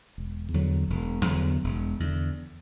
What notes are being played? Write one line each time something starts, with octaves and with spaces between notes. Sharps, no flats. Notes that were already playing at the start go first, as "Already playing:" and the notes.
E1
E2 D3 F#3
E1
E2 D3 F#3
E1
E2 D3